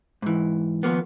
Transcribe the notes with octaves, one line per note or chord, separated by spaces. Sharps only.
G#2 E3
D#2 F3 A#3 B3